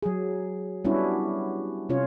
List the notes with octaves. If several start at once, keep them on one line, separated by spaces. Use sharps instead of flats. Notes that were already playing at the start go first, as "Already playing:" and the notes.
F#3 G#4
G3 B3 C#4 D4 E4 F#4
C3 C#4 F4 C#5